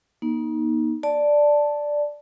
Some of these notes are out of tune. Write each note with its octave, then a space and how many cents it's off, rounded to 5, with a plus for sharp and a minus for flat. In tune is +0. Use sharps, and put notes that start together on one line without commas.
A#3 +40 D#4 +0
D5 +0 A5 +0